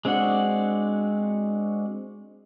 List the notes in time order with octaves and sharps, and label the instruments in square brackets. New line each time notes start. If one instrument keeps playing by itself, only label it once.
[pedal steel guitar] G#3 C4 D4 F#4 F#5